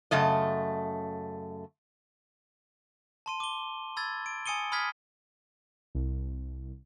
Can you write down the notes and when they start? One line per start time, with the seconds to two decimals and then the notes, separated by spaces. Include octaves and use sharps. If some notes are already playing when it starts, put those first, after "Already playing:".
0.11 F#2 C#3 A3 D#5
3.26 A5 C6 D#7
3.40 D6 G7
3.97 B5 E6 G#6 A6
4.26 D7
4.46 G#5 D#6 C#7 D#7 G7
4.72 B5 D#6 F6 G#6 B6
5.95 C2